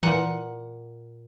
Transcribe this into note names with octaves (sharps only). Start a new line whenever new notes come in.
A#2 E3 F#5